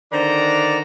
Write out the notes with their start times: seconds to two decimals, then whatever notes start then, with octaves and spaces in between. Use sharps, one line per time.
0.12 D3 D#3 D4 C5 D5 A#5